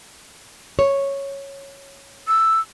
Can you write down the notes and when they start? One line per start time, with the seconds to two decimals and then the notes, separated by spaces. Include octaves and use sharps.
0.79 C#5
2.27 E6